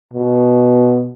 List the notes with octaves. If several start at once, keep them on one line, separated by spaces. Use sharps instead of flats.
B2